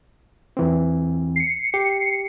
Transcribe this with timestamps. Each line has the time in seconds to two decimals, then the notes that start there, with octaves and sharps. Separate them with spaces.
0.57 E2 E3 C4
1.36 C7 C#7
1.74 G4